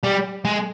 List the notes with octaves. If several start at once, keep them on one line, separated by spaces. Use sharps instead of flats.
G3
G#3